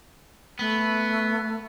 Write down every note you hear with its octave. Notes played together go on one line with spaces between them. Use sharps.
A3 B3